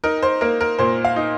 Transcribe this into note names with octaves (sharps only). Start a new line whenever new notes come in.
D#4 A#4
C5
A#3 A#4
A#4
A#2 C5
F5
D#4